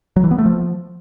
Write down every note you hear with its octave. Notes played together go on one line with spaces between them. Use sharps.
F#3
E3
B3
A3
F3